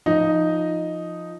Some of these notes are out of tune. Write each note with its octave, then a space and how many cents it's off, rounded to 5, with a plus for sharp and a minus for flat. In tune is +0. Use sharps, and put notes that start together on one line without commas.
F3 -5 D#4 +0 D#5 +0